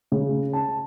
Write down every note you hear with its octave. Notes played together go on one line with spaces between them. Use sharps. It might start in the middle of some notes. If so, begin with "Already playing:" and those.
C#3
A5